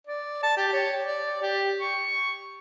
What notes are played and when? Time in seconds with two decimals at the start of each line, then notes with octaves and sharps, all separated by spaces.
0.07 D5
0.43 A5
0.57 G4
0.73 C#5
1.03 D5
1.42 G4
1.80 C#6